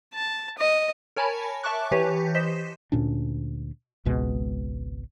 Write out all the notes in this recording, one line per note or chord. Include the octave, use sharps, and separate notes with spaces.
A5
D#5
A#4 C#5 G#5 A5 B5
E5 A5 C#6 D6 F#6
E3 G4 B4 C#5
C5 D#5 B6 E7
D2 A#2 C#4 D4
G#1 C#2 B2 G#3